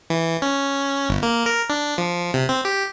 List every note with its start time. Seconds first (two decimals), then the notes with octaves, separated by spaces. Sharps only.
0.10 E3
0.42 C#4
1.09 G1
1.23 A#3
1.46 A#4
1.70 D4
1.98 F3
2.34 C3
2.49 C4
2.65 G4